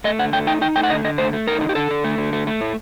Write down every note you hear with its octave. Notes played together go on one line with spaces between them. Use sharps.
A3 D#5
D3 F#5
A3 G5
D#4 G5
D#4 G5
A3 G5
F#5
D3 D#5
D3 D#5
A3 C5
A3
D#4 A#4
D3
G4
D3 A4
D3
A3
D3
A3
A3
A2